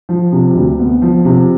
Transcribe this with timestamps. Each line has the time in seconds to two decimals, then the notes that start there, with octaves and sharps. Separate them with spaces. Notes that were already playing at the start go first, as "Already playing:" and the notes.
0.09 F3
0.33 C3
0.55 D2
0.79 B3
1.02 F3
1.25 C3